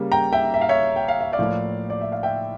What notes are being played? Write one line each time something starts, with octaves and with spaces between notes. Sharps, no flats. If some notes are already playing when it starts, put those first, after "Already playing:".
Already playing: C#3 G3 A#3
G5 A#5
E5 G5
E5
F5
C#5 E5
G5
F5
E5
D5 F5
A2 F3 A#3
D5
E5
F5
E5 G5